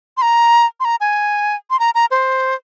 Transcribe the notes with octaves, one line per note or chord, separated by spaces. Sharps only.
C6
A#5
C6
A#5
G#5
C6
A#5
A#5
C5